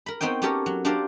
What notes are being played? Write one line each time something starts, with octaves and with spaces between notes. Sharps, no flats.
A#4 B5
B3 C4 D#4 C#5 G5
B3 C#4 G4 A4 A#4 C#5
F#3
D4 F4 G4 A#4 C5 D5